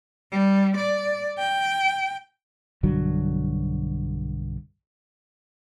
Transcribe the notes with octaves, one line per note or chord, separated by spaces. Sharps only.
G3
D5
G5
B1 G2 D3 F#3